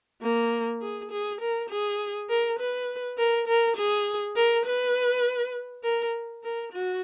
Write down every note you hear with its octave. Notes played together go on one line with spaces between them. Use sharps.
A#3
G#4
G#4
A#4
G#4
A#4
B4
A#4
A#4
G#4
A#4
B4
A#4
A#4
F#4